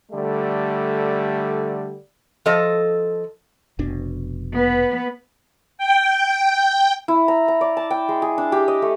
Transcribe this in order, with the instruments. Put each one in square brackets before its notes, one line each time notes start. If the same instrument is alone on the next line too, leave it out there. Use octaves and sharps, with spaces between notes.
[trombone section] D3 G3 A3
[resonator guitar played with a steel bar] F3 A4 D#5
[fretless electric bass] F1 B2 D4
[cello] B3 B4
[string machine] G5
[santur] E4
A#5
A#5
D5
A5
G5
G#3
G#4
D4
G4
D#5
A3